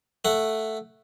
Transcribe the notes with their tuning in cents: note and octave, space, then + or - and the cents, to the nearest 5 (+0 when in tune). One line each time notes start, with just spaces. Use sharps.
A3 +0 F#5 +0